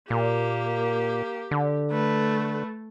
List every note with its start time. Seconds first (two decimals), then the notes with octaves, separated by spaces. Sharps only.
0.10 A#2 A#3 G4
1.51 D3
1.91 A3 B4